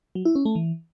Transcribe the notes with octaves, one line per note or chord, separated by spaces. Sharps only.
F#3
E4
C#4
A3
E3